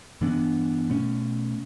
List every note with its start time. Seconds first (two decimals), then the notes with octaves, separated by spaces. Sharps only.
0.21 G2 E3 B3 D4
0.89 B2 A3 C#4